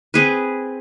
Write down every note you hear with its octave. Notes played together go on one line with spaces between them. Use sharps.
C4 G#4 B4